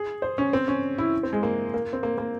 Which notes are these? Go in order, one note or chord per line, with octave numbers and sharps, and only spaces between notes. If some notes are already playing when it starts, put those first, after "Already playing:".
Already playing: G#4
C5
C#4
C4
C#4
E4
C4
G#3
A#3
A#3
C4
A#3
A#3